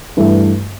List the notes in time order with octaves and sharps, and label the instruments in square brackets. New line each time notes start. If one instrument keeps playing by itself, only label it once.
[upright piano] G2 E3 A3